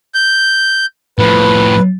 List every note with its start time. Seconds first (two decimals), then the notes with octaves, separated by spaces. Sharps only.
0.14 G6
1.19 A2 F3 B4